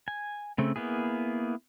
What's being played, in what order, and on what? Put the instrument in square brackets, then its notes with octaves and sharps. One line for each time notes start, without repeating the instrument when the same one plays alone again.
[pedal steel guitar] G#5
C#3 A3 C4
A#3 B3 E4 G#4